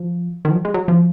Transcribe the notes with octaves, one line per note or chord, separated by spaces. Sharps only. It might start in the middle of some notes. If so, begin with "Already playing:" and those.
Already playing: F3
D#3
F3
F#3
G#3
F#3
F3